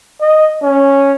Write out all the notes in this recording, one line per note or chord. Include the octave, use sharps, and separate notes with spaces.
D#5
C#4